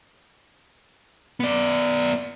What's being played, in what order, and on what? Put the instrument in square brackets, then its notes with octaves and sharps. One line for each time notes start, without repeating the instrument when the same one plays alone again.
[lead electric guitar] B3 D5